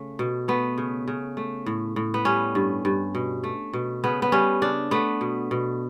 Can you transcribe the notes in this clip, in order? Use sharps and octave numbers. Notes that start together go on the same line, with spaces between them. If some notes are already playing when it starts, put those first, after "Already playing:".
Already playing: C#3 A3
B2
A3 B3
C#3
C#3
A3
A2
A2
B3
G3 C#4
G2
G2
B2
A3
B2
C#3 B3
B3
G3 C#4
C#3 D4
A3 B3
B2
B2